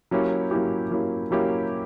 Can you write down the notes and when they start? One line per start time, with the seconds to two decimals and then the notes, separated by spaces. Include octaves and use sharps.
0.11 F#3 A#3 C#4 E4 G4
0.51 F#3 A#3 C#4 E4 G4
0.91 F#3 A#3 C#4 E4 G4
1.31 F#3 A#3 C#4 E4 G4